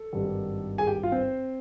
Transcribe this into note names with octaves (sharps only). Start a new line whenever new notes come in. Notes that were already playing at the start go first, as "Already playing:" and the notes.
Already playing: A4
G#1 G2 D#3 G3
G#4 G#5
G4 G5
F4 F5
C4 C5